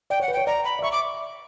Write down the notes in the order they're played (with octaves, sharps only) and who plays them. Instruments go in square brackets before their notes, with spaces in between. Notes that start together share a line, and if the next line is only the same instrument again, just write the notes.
[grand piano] D5 [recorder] G5
[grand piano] C#5 [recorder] F#5
[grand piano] B4
[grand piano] C#5 [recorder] G5
[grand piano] D5 [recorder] A#5
[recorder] B5
[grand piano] D5
[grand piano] E5 [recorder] C#6
[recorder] D6